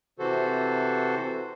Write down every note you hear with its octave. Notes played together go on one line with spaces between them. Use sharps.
C3 E3 F#4 A4 C5